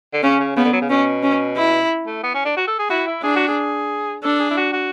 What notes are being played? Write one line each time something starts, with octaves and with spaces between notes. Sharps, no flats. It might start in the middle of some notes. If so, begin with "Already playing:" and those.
D3
C#3 C#4
C#3
C#3 B3
D3
F#3
C#3
B2 C#4
C#4
E4
A3
B3
C#4
D4
F#4
A4
G#4
E4 F#4
E4
D4 G#4
F#4
G#4
D4 A4
G#4
E4
F#4
F#4